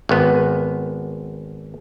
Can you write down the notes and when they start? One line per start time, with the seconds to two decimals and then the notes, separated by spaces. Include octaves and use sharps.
0.09 G#1 B3